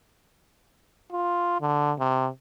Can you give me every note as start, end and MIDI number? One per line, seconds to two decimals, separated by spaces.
1.13 1.57 65
1.61 1.93 50
1.99 2.29 48